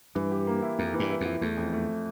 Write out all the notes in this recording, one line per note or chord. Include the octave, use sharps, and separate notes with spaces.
G2 E3
G4
A#3
E4
F2 A#3
E3
G2
E4
F2 E4
E2 A3
F2
A3